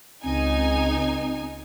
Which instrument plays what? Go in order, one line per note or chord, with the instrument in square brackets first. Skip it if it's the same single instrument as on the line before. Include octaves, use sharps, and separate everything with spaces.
[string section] C#2 D#4 G#5 [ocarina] C4